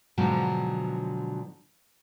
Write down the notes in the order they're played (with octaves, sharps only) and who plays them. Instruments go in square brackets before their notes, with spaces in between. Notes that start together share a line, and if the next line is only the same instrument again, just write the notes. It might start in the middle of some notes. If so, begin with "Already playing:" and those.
[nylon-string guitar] G#2 B2 D3 F3 F#3